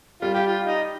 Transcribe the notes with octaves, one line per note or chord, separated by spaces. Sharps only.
G3 F4
G4
F4
D#4